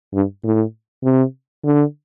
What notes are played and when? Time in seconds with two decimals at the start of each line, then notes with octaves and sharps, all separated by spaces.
0.14 G2
0.44 A2
1.04 C3
1.65 D3